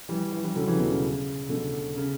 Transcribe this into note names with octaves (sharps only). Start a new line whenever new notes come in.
E3 G3
E3 G3
E3 G3
D3 F#3
C#3 E3
B2
C#3
B2 D3
C#3